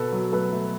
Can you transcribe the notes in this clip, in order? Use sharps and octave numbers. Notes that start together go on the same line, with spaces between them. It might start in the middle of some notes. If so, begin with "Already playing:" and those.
Already playing: B2 A4 B4
F#3
A3 A4 B4
A3